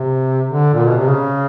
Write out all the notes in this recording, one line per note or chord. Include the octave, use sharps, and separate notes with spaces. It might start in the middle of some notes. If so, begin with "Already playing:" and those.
Already playing: C3
D3
A#2
B2
C3
C#3